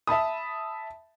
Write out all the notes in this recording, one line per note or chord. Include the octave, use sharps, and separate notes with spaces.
E5 A5 B5 D#6